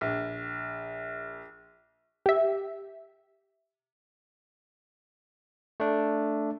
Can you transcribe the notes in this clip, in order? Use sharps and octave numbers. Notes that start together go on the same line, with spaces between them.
A#1
G4 E5
A3 D4